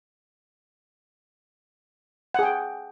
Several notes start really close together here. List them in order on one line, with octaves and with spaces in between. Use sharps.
F#5 G#4 G5